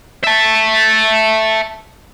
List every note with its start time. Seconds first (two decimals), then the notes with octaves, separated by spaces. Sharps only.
0.24 E5 A5